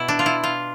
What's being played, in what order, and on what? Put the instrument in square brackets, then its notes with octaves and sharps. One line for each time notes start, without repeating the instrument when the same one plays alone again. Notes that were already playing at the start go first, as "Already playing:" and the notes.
Already playing: [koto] B2 B3 E4
D4
F4
E4
F4